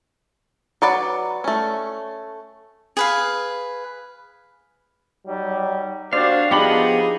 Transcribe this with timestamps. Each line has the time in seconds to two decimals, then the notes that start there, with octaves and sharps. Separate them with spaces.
0.82 F#3 B4 D5 F#5
1.44 A3 C#4
2.97 G#4 B4 F5
5.26 F#3 G3 D#4
6.13 A#3 D4 F#4 G4 C5 D5 F5
6.51 F3 B3 D4 D#4 F4 G4 G#4 B5